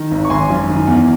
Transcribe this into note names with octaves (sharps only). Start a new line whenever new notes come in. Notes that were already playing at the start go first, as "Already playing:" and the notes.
Already playing: D#3
G#1
C#6
G#1 G#5 C6
F#2
D#3
E2